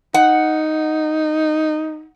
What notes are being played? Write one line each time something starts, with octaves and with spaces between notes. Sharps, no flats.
D#4 F#5